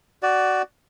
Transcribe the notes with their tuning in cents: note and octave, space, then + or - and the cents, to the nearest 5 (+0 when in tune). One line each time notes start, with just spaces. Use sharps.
F#4 +15 D5 +0